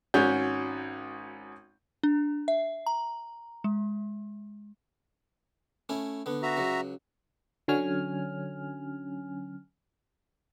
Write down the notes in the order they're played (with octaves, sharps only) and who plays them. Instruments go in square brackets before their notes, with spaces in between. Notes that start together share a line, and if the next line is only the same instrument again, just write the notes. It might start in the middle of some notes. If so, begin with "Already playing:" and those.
[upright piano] G#1 C#4 F#4 G6
[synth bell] D4
E5
A#5
G#3
[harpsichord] A3 C#4 E4
D3 B3
[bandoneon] F#4 E5 A#5
[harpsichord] C#2 F#3
[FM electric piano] D3 F#3 C#4 G#5 F6